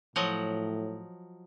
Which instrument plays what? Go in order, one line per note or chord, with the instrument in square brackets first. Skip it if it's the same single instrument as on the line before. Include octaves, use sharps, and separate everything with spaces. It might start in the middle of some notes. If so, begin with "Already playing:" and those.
[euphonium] A2 [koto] F3 F#3 D#5